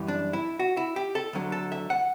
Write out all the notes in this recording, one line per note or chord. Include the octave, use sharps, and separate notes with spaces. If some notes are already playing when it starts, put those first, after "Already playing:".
Already playing: F#2 E3 G3
D4
E4
F#4
E4
G4
A4
D2 D3 F#3
A4
E5
F#5